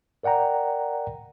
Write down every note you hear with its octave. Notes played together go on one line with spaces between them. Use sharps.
A#4 D5 F#5 G5 A#5